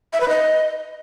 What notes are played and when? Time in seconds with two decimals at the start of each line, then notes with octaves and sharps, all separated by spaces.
0.13 E5
0.21 B4
0.28 D#5